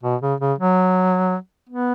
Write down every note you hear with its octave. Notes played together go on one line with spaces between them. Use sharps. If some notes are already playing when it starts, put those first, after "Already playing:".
B2
C#3
C#3
F#3
B3